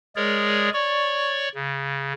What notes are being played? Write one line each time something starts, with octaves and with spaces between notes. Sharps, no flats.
G#3 G#4 A#4 C#5 D5
C#5 D5 C#6
C#3